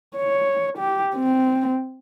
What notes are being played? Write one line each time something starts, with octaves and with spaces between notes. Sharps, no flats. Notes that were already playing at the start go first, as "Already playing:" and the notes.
C#5
G4
C4